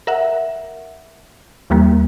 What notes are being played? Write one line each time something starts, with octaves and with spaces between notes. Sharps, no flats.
A#4 E5 F#5
D#2 E3 G3 A#3